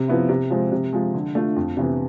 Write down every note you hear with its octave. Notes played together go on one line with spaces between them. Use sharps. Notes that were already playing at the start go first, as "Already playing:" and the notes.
Already playing: C3
F3 B3 E4
C3
F3 G#3 C4
C3
F3 G#3
D3
A3 D4 F4
F2
C3 E3 B3